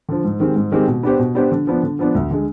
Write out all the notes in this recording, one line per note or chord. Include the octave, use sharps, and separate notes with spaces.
D3 F3
G#2
D#3 G#3 C4 G4
G#2
D#3 G#3 C4 G4
B2
B3 D4 G4 C5
B2
B3 D4 G4 C5
D3
F3 B3 D4
D3
F3 B3 D4
D2
D3 G#3